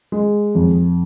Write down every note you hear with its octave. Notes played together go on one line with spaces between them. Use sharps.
G#3
F2